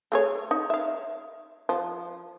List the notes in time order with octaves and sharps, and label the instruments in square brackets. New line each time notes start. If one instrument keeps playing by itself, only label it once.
[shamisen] A3 G#4 C#5
D#4
E5 F5
F3